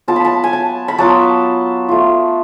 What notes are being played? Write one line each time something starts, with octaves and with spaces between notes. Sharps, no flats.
F#3 B3 F4 A5
B5
A5
G#5
A5
B5
F#3 B3 F4 A5
A3 F4